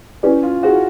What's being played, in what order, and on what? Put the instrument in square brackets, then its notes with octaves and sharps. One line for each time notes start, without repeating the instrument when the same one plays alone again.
[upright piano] C#4 [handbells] E4 G4 B4 D5
[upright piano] F4
[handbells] E4 G#4 C5 F5 [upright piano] F#4